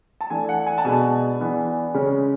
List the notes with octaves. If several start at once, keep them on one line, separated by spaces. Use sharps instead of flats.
A5
E3 A3 D4 G#5
F#5
G#5
A5
B2 G#3 B3 D4 G#5
E3 B3 D4
C#3 G#3 C#4